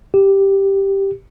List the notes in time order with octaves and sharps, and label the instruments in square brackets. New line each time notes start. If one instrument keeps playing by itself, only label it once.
[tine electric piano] G4